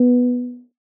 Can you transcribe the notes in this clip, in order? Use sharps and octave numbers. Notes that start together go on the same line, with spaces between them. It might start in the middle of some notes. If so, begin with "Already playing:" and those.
Already playing: B3